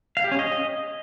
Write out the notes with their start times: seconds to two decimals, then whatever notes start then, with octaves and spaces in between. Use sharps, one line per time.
0.17 F5
0.24 G4
0.31 C#4
0.39 D#5